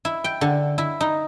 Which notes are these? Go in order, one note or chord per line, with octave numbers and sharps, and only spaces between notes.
E4
G5
D3
E4
D#4